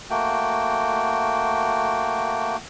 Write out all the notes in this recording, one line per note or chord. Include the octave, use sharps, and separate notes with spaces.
A3 A#3 F#4 G5